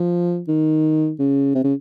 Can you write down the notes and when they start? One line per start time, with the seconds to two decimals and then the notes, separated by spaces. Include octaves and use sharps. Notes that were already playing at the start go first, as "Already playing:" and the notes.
Already playing: F3
0.48 D#3
1.19 C#3
1.55 C3
1.64 C#3